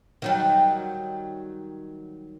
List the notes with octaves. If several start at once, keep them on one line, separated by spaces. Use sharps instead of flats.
D#3 F#3 G3